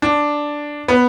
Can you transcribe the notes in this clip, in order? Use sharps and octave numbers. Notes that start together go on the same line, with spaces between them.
D4
B3